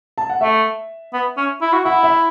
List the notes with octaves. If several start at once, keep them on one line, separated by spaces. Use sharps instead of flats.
A5
F#5
A3 E5
B3
C#4
E4
F#4
E4 F#5
E5